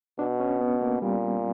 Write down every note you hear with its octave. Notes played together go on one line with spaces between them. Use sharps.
B2 D4
C#4
B3
A#3
A#2 G3